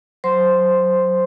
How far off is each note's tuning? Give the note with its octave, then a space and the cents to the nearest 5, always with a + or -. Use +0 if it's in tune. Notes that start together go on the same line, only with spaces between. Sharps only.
F#3 +0 C5 -5 C6 +0